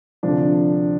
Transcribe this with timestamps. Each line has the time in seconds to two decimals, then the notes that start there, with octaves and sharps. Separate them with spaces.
0.23 D2 C3 F3 D4